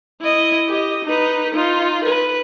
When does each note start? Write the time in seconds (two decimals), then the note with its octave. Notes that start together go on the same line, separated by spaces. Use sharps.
0.22 E4 D#5
0.68 G4 D#5
1.05 D#4 B4
1.55 D#4 F4
2.04 B4